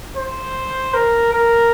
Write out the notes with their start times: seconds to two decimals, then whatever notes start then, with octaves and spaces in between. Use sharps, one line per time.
0.17 C5
0.94 A#4
1.32 A#4